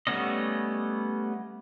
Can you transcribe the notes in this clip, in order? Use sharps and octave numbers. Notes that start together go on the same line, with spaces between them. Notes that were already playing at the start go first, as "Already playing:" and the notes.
G3 A3 B3 C#4 D#5